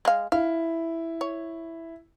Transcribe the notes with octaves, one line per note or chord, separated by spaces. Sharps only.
G#3 F5
E4 F5
C#5